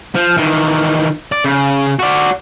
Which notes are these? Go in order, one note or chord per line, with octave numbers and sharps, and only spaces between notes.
F3
D#3 E3
D5
C#3
F#4 D5